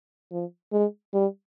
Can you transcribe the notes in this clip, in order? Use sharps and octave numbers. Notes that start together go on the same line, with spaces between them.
F3
G#3
G3